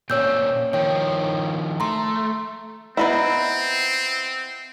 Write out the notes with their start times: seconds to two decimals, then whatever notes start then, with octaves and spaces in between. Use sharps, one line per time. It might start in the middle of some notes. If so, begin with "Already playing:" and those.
0.10 A#2 C4 C#4 C#5 E6 G6
0.73 D#3 F3 C#5 G5
1.80 A3 A#5 C6
2.97 B3 C4 D#4 E4